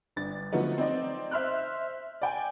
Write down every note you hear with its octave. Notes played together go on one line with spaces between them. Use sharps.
G1 D4 A6
D3 F3 F#3 A3 B3 D#4
C4 D#4 D5 D#5
C5 E5 C6 F6 F#6
D5 G5 G#5